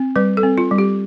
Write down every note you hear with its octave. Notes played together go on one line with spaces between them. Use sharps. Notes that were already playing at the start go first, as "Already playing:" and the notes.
Already playing: C4
G3 B4
A4
C4
F4
G3
G4